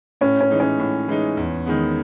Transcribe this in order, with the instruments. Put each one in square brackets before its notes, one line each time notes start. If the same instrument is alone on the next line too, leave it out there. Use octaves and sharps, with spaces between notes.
[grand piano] A2 [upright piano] C#4
[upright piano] C#4
[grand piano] E3 G#3 D#4
[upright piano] C#4
[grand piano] A2
E3 G#3 D#4
E2
D#3 G#3 B3